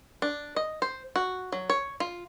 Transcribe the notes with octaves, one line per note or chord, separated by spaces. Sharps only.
D4
D#5
C5
F#4
F#3
C#5
F4